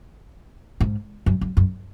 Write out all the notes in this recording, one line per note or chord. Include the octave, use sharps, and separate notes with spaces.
G#2
F#2
F#2
F#2